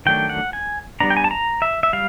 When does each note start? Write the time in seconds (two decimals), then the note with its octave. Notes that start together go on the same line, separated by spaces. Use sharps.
0.06 D#3 F#3 A3 D4 G5
0.29 F#5
0.53 G#5
1.00 G3 B3 D4 A#5
1.10 G5
1.17 G#5
1.24 A5
1.31 A#5
1.62 E5
1.83 E5
1.93 G3 F5